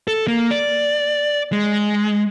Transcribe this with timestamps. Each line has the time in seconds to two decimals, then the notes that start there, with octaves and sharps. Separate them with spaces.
0.08 A4
0.27 A#3
0.51 D5
1.52 G#3